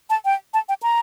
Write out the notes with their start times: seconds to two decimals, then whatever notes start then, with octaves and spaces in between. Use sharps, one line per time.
0.10 A5
0.25 G5
0.54 A5
0.69 G5
0.83 A#5